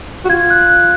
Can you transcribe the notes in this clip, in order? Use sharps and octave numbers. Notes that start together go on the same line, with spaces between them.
F#4
F4 G#6
F#6
F#6